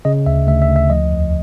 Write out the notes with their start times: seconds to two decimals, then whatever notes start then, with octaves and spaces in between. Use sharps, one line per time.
0.05 C#3 D#5
0.26 D2 E5
0.47 D2 E5
0.62 E5
0.69 D2
0.76 E5
0.90 F3 D#5
1.12 E2